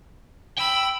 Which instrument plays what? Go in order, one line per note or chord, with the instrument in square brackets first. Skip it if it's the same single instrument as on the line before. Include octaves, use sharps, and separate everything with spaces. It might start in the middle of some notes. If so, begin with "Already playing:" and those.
[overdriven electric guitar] G5 [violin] B5 E6